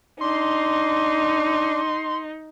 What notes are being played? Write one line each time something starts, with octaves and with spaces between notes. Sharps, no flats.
D4 D#4 C6